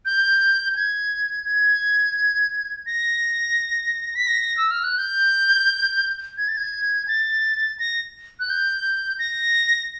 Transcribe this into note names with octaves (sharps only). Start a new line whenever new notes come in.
G6
G#6
G#6
A#6
B6
A#6
E6
F6
F#6
G6
G#6
A6
G#6
A6
A#6
F#6
G6
A#6